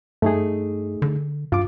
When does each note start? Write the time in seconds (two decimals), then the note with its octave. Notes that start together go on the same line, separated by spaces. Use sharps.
0.22 G2 A3 D#4 G#4
1.02 D3
1.52 G2 F4 D6